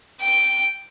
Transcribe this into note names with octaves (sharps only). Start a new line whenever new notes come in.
G5